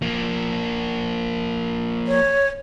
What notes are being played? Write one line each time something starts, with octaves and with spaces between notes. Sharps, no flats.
F3 A#3
C#5